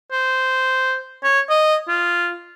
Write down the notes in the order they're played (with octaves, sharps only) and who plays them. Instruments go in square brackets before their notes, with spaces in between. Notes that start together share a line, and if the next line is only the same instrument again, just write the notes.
[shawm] C5
C#5
D#5
F4